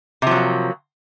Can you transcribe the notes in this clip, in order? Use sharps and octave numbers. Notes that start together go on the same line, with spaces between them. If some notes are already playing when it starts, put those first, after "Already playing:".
C3 F3 F#3 A#3